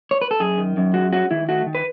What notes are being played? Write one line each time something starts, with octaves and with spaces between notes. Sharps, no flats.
C#5
B4
A4
F#2 G#4
D#3
F#2
G#3 F#4
C#4 F#4
D#3 E4
A3 F#4
D#3
B4